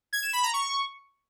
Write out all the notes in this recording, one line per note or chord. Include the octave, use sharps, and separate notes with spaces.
G#6
E7
B5
A#5
C#6